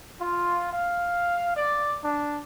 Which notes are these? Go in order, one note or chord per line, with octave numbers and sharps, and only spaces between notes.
F4
F5
D5
D4